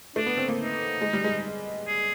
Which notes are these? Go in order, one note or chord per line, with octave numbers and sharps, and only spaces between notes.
A3 D4
B3
C4
A#3
D#4
G#3
G3
G#3
G#4